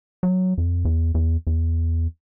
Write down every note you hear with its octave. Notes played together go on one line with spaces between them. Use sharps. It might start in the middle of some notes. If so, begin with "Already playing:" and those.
F#3
F2
E2
E2
E2